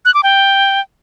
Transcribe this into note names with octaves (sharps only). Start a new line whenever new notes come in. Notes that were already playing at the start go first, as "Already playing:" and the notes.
F#6
D6
G5